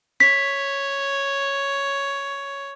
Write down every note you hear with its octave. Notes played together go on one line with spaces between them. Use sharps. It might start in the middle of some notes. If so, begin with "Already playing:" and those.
C#5 B6